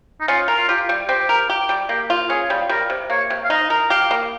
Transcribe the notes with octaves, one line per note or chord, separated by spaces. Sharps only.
D#4
C#4 F4
A#4
F4
F4 G4
G3
C4 G4
A#4
G4
G3
A#3 G4
F4
C#4 G#4
G3
G3 A#4
C3
A#3 C#5
C3
F5
D#4 D#5
A#4
G4 F5
A#3